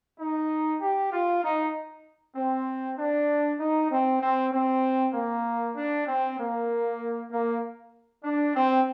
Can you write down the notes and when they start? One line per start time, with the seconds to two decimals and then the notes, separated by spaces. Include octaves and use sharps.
0.19 D#4
0.81 G4
1.12 F4
1.43 D#4
2.36 C4
2.98 D4
3.60 D#4
3.90 C4
4.22 C4
4.52 C4
5.14 A#3
5.76 D4
6.07 C4
6.38 A#3
7.31 A#3
8.24 D4
8.55 C4